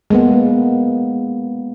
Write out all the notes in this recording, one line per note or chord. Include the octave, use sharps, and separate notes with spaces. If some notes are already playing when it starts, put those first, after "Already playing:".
G#3 A#3 B3